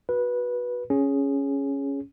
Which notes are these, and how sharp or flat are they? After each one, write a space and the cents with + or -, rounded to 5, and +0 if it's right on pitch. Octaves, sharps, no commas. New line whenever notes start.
F#4 +0 B4 -15
C#4 +0 G#4 +0